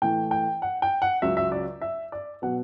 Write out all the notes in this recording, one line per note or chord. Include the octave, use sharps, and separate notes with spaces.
A2 E3 A3 G5
G5
F#5
G5
F#5
C#2 C#3 F#3 E5
E5
D5
E5
D5
B2 F#3 B3 F#5